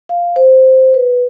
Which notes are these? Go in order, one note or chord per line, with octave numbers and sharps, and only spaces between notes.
F5
C5
B4